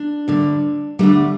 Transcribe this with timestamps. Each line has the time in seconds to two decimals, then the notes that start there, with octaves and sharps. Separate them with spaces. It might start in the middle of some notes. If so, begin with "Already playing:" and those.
Already playing: D4
0.28 D2 D3 G3
0.99 D2 D3 G3 A3